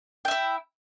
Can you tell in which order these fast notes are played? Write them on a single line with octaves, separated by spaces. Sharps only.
G5 E5 E4